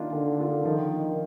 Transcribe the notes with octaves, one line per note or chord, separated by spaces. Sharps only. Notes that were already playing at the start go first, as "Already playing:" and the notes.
Already playing: D#3 A#3 D4 F4
D3 D#3
A#3 D4 F4
D#3 F3
A#3 D4